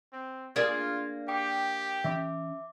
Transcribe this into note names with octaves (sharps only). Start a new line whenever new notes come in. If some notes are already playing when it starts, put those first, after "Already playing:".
C4
A#3 D4 F4 G#4 G#6
G4 G5 D6 D#6
E3 C#4 E5 D6